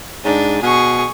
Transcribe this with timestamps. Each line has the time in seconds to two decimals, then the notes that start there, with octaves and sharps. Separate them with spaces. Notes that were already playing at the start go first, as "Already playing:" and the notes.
0.25 G#2 D4
0.62 B2 G#4 C#6